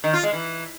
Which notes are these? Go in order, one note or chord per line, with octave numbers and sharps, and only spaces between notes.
D#3
F4
G#3
E3